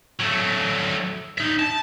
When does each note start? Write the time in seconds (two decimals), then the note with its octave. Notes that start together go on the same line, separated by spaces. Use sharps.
0.20 F#3 A3
1.38 D#4 E5
1.59 A5